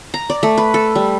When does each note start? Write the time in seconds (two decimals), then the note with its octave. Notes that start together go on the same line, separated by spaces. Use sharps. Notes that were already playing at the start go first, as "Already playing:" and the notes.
0.14 A#5
0.30 D5
0.43 A3
0.58 B4
0.74 A4
0.95 G3